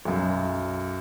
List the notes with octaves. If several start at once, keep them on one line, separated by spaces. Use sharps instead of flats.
B1 F#2